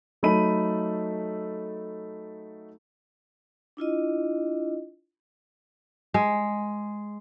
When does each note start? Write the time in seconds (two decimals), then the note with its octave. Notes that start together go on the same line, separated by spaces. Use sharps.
0.23 F#3 A3 D#4 A4 B5 D#7
3.77 D4 E4 F4 D#5
6.14 G#3